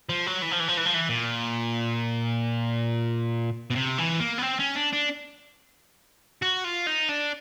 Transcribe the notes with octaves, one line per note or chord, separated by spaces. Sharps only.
F3
F#3
E3
F3
E3
F3
E3
F3
E3
A#2
B2
C3
E3
A#3
B3
C4
C#4
D4
D4
F#4
F4
D#4
D4